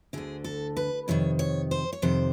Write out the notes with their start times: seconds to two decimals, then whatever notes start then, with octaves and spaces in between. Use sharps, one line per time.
0.13 D2 D3 G#4
0.44 A4
0.77 B4
1.08 F2 C3 D#3 C#5
1.39 C#5
1.71 C5
1.93 C#5
2.02 F2 C3 D#3 C5